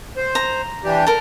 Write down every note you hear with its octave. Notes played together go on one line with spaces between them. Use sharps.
C5
A#5
E3 D4 G4
A4 A#4